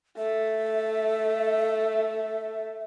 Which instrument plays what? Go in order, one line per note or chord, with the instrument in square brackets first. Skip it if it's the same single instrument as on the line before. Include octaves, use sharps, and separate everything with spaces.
[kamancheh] A3 [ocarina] E5